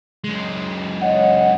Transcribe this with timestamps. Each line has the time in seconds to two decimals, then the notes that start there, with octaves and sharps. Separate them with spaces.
0.24 F#2 G#3
1.01 C#5 D#5 F#5